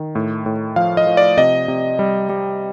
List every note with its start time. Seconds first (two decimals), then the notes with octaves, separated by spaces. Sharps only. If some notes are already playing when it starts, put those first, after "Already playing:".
Already playing: D#3
0.15 A2
0.46 A2
0.76 F3 F5
0.97 D#5
1.07 F3
1.17 D5
1.38 C3 D#5
1.68 C3
1.99 G3
2.29 G3